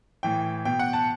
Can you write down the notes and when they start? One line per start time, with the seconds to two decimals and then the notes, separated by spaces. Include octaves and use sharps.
0.23 A2 E3 G5
0.65 B2 G5
0.79 F#5
0.93 A5